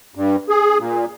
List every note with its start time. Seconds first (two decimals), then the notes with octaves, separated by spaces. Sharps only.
0.15 G2
0.49 G#4
0.79 A#2